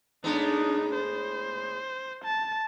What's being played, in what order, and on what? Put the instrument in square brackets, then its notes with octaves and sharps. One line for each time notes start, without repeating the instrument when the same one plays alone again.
[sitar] A2 G#3 B3 [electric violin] D4 D#4
[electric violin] C5
A5